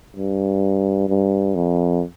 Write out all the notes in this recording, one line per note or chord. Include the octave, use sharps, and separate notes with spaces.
G2
G2
F2